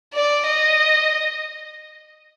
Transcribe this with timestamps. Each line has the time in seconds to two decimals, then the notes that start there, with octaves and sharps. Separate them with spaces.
0.14 D5
0.47 D#5